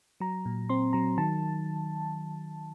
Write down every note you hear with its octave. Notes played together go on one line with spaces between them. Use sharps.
F#3 A#5
A#2
C4 C6
F#3 A#5
D#3 A5